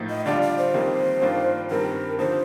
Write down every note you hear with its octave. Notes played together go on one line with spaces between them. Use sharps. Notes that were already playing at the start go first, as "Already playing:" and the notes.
Already playing: A2 F3 A#3 D#4
D#5
D3 G3 D4 F4 D5
D5
C5
F2 D#3 G3 A#3
G2 D#3 A#3 D4 F4
G2 D#3 G3 C4 A#4
D3 F3 A#3 D#4 C5